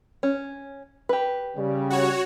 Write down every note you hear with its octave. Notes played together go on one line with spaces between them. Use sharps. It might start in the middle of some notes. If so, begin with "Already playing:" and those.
C#4
G4 B4
C#3 G3
F#4 C#5